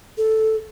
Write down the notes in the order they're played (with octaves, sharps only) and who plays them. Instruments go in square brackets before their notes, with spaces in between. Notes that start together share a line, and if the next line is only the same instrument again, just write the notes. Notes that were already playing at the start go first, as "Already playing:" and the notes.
[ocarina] A4